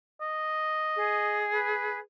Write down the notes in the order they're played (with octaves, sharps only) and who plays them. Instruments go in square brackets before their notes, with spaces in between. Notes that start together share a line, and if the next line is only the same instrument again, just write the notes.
[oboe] D#5
[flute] G#4
[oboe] B4